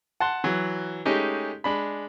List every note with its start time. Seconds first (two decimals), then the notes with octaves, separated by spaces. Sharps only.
0.20 F#5 A5 C6
0.44 E3 F#3
1.05 G#3 A3 C#4 D#4 G4
1.64 G#3 D4 B5